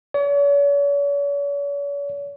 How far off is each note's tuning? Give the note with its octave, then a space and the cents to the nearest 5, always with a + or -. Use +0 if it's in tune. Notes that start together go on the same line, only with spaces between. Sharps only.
C#5 +45